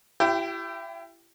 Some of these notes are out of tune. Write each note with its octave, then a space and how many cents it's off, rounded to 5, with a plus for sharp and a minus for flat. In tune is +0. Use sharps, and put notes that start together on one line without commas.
E4 +30 G4 -20 G5 +15